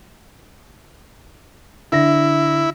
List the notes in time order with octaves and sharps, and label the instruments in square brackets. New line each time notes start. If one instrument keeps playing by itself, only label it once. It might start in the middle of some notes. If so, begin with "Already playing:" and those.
[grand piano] D3 E5 A#6 [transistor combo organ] E4